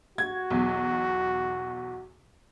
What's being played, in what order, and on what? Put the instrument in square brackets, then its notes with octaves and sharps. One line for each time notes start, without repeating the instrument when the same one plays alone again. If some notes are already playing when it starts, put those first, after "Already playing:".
[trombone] F#4 [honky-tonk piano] G#6
[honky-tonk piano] B1 E2